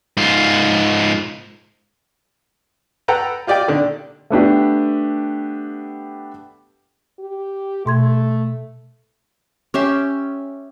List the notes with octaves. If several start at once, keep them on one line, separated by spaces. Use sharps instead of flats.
G#2 F4
A4 B4 F#5 G5 A#5
F4 G4 D5 D#5 G5
A#2 D3 D#3
A3 B3 D4 G4
G4
B2 A3 C6 G#6
C#4 G4 E5 C6